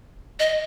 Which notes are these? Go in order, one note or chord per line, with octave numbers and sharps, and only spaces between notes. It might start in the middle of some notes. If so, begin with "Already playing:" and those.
D#5